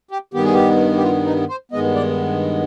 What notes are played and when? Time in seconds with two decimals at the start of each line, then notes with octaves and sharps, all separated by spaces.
0.11 G4
0.34 G2 D#3 B3 G4
0.44 G#4
0.54 G4
0.97 G4
1.03 F4
1.26 D#4
1.49 C5
1.72 G2 D#3 G#3 B3 D#5
1.95 D5